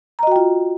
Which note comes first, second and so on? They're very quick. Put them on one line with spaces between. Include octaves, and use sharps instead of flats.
A#5 D#5 F#4 G5 F4